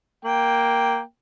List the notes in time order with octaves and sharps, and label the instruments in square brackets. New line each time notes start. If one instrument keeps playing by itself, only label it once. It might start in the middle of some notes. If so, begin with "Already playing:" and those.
[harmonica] A#3 G5